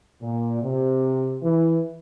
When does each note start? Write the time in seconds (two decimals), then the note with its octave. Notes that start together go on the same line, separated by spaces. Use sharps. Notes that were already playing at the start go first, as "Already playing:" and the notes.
0.22 A#2
0.62 C3
1.43 E3